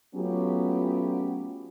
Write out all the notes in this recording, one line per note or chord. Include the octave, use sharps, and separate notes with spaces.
F#3 A3 B3 C#4 F4 G4